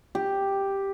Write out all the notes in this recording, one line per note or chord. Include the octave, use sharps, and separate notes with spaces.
G4